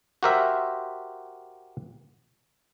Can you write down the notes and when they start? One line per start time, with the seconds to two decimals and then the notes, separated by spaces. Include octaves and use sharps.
0.23 F#4 G4 A#4 C5 E5